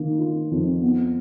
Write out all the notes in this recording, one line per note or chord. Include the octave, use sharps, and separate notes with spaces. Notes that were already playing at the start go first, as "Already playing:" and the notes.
Already playing: D#3 A#3
F4
F2
B3